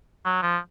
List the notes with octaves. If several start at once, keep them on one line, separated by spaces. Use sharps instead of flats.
F#3
F3